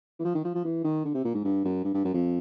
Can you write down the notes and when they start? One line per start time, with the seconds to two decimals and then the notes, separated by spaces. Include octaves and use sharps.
0.19 E3
0.25 F3
0.35 D#3
0.45 F3
0.55 F3
0.65 E3
0.84 D#3
1.05 D3
1.15 C3
1.25 A#2
1.35 G#2
1.44 G2
1.65 F#2
1.84 G2
1.95 G2
2.05 F#2
2.14 F2